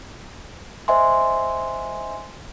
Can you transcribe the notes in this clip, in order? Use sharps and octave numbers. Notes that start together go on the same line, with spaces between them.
C5 D#5 E5 G#5 C6